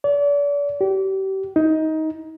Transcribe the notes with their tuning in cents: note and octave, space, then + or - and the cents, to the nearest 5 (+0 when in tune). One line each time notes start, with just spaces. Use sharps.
D5 -40
G4 -35
D#4 +20